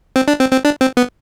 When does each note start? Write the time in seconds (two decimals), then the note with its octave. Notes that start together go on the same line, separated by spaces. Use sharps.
0.16 C4
0.28 D4
0.40 C4
0.52 C4
0.65 D4
0.81 C4
0.97 B3